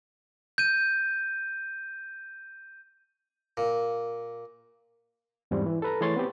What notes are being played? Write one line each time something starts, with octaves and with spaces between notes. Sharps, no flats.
G6 D#7
A#2
E2 G#2 G3 C4
E3
A4 B4 A#5
E3 A3 G#4 C#5 C6 A6
B3 C4 G4